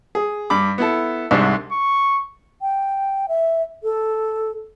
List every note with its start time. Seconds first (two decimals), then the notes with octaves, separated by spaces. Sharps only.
0.15 G#4
0.50 G2 B5 D6
0.78 B3 E4 A4
1.31 C2 G#2 C3 D4
1.72 C#6
2.61 G5
3.29 E5
3.83 A4